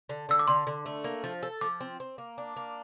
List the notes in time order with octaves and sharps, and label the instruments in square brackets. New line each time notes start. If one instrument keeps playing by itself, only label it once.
[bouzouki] D3
[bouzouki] D3 [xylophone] E6
[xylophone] D6
[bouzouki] D3 [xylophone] C6
[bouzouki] D3
A3
A#3
F3
A4
[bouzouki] F3 [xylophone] D6
[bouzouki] C4
C4
A#3
D4
A#3